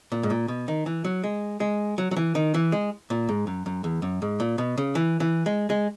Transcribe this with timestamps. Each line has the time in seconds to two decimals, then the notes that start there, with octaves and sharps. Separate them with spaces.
0.12 A#2
0.23 G#2
0.30 A#2
0.48 B2
0.68 D#3
0.86 E3
1.04 F#3
1.24 G#3
1.60 G#3
1.98 F#3
2.11 F#3
2.17 E3
2.35 D#3
2.54 E3
2.72 G#3
3.10 A#2
3.29 G#2
3.47 F#2
3.66 F#2
3.84 E2
4.02 F#2
4.22 G#2
4.40 A#2
4.58 B2
4.78 C#3
4.95 E3
5.20 E3
5.46 G#3
5.70 G#3